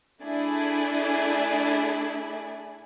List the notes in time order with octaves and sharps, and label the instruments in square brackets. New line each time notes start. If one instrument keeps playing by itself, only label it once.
[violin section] A3 D4 E4 G#4 D5 G#5